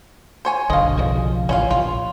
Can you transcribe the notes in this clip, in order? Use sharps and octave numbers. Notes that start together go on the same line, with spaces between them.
C5 C#5 G#5
F#1 B1 D3 D#5 F5
B1 C#3 F3
A1 C#4 F4 F5
A#1 F4